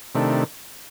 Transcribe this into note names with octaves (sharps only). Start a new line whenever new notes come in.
C3 D#3 A3 D4